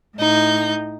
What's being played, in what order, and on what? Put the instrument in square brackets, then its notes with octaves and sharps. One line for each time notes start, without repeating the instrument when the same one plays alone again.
[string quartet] A2 D#4 G6